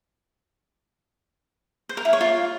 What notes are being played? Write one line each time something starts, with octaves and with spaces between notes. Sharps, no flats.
C5
A#4
E4
C#5
F4